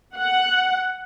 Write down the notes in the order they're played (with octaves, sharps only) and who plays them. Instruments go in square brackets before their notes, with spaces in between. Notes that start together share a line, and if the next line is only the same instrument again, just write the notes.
[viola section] F#5